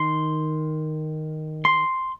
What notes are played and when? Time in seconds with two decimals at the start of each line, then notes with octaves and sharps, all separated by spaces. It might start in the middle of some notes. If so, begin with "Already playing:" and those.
Already playing: D#3 C6
1.65 C6